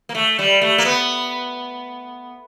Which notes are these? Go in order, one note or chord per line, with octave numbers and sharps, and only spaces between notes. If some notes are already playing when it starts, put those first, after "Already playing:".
A#3
A3
G3
A3
A#3
B3